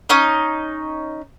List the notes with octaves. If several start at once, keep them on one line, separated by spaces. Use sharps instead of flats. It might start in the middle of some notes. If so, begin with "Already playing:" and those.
C#4 D#4 D#5